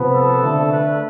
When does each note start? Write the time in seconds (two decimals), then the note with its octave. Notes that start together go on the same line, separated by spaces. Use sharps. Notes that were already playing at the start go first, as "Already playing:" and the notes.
Already playing: C3 F3 B3
0.15 A4
0.44 D3 A3 D4
0.72 B4